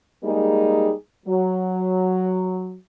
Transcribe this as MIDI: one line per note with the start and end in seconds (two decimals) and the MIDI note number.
0.24 0.92 55
0.24 0.92 56
0.24 0.92 58
0.24 0.92 63
0.24 0.92 68
1.26 2.75 54